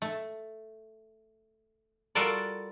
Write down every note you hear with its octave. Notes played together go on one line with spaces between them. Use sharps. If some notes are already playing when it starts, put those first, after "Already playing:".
A3
G3 F4 F#4 A4 A#4 D5